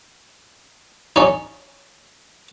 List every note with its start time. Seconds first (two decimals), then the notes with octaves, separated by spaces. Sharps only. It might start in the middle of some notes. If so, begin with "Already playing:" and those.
1.16 C#4 D#4